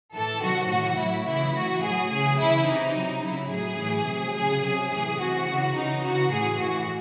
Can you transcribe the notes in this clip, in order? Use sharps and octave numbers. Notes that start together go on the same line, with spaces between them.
A2 E3 A4
C3 D#3 F#3 F#4
A2 E3 F#4
A2 F#3 E4
C#3 E3 E4
A2 E3 F#4
A2 F#3 G#4
C#3 E3 G#4
C#3 E3 E4
C3 E3 D#4
C3 F#3
C#3 F#3 E4
A2 F#3 G#4
A2 E3
C3 F#3
C#3 F#3 G#4
C3 F#3 G#4
A2 E3
C3 E3 F#4
C#3 E3
C#3 E3 D#4
C#3 E3 F#4
A2 E3 G#4
A2 E3 F#4